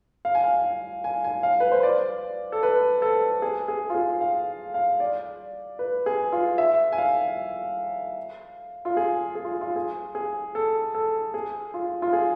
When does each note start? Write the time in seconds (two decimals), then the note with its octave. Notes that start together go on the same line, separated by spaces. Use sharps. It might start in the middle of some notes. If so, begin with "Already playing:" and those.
0.25 F5
0.35 G#5
0.43 F5
1.04 G#5
1.24 G#5
1.43 F5
1.60 B4
1.72 C5
1.83 D5
2.52 A4
2.63 B4
3.02 A4
3.42 G#4
3.68 G#4
3.90 F4
3.94 G#4
4.21 F5
4.74 F5
5.00 D5
5.79 B4
6.06 G#4
6.32 F4
6.58 E5
6.92 G#5
6.98 F5
8.85 F4
8.97 G#4
9.35 G#4
9.45 F4
9.61 F4
9.76 G#4
10.15 G#4
10.55 A4
10.95 A4
11.34 G#4
11.74 F4
12.02 F4
12.13 G#4